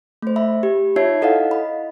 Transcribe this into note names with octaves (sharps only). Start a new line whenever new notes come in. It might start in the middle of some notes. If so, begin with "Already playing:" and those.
A3 C5
E5 B5
G4
D#4 F4 C#5 E5 G#6 C7
E4 A4 D#5 F5 F#5
D#5 B5